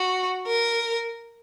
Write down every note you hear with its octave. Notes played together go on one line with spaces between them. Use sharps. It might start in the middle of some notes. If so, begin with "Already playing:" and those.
Already playing: F#4
A#4